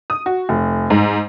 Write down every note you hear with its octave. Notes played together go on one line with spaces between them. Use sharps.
D#6
F#4
F1
G#2